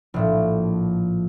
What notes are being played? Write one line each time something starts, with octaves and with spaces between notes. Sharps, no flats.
A#1 A2 F3